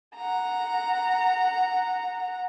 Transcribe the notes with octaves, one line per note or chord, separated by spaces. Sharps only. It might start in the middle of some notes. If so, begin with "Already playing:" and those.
F#5 A#5